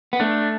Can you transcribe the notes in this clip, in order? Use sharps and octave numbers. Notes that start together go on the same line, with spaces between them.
B3
A3 D4